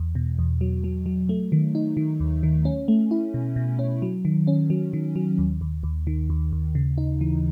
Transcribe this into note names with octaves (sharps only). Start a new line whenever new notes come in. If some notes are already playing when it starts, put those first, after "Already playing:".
Already playing: E2
B2
E2
F#3
F#3
F#3
A3
D#3
D#4
D#3
D#2
D#3
C#4
A3
E4
B2
B2
C#4
F#3
D#3
C#4
F#3
D#3
F#3
D#2
D#2
D#2
D#3
D#2
D#2
C#3
D#4
E3